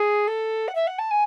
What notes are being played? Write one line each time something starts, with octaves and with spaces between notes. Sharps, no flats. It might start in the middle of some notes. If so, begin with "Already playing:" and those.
Already playing: G#4
A4
F#5
E5
F#5
A5
G#5